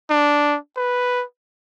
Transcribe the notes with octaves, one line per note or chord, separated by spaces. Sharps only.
D4
B4